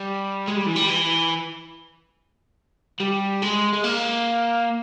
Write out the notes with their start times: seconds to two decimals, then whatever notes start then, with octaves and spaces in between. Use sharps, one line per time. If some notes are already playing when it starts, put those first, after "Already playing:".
Already playing: G3
0.48 G#3
0.57 G3
0.66 E3
0.76 G3
0.90 E3
3.00 G3
3.43 G#3
3.73 G#3
3.84 A#3